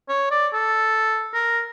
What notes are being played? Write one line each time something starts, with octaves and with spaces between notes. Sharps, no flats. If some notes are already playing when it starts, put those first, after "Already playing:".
C#5
D5
A4
A#4